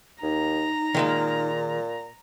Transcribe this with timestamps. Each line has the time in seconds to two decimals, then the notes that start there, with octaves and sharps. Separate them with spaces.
0.22 D#2 D#4 A#5
0.94 A#2 D#3 G#3 A#3